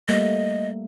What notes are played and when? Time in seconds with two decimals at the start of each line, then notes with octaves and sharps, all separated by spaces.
0.09 G3 A3 A#3 D#5